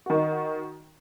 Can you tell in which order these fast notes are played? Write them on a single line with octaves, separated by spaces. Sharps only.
F#4 D#3 D#4